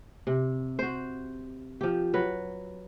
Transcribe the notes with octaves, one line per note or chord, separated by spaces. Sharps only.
C3
F#4 C5
F3 G4
F#3 B4